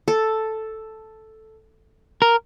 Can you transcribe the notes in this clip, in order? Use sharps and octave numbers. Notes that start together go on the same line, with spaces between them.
A4
A#4